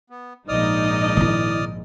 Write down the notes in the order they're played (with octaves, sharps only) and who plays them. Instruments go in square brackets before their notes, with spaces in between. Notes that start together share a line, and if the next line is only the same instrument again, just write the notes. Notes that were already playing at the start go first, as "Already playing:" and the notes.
[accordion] B3
[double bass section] A#1 G#2 [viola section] D#4 D#5 [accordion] D5 D#6 F6
[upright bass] D#3 E4